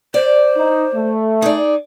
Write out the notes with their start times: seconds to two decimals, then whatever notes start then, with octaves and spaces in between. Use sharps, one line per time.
0.14 C5 D5
0.57 D#4
0.94 A3
1.42 D#4 G#4 D5